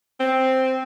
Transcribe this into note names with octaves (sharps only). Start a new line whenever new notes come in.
C4